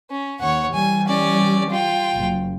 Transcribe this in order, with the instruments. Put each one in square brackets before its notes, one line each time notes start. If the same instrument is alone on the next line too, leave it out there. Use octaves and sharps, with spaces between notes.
[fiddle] C#4
[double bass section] D#2 [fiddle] C#5 F#5
[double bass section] E3 G3 [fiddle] G#5
[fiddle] C#4 D5
F4 G5
[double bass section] F#1